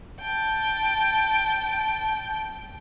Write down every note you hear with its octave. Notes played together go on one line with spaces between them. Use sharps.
G5 A5